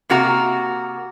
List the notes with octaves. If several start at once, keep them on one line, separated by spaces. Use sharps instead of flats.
C3 A#3 F#4 A#5